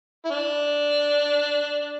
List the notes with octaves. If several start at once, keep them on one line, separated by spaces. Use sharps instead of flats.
E4
D4